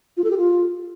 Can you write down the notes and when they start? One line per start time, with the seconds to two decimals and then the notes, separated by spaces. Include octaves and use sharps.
0.17 F4
0.24 A4
0.31 G4
0.38 F4